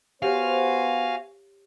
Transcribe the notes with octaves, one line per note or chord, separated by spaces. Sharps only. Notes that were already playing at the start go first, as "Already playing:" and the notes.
B3 F#4 G4 C5 C#5 F5 G#5 C#6